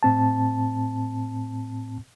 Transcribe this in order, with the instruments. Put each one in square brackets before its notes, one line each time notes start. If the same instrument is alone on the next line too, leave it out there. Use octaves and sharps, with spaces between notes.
[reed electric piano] A2 C4 A5